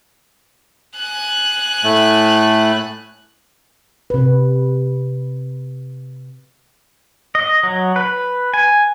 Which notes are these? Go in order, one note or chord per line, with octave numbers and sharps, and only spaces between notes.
G#5 F#6
A2 A3
C3 B4
D#5
F#3
B4
G#5